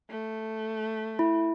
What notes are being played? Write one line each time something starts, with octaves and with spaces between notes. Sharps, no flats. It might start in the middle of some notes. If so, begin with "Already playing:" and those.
A3
E4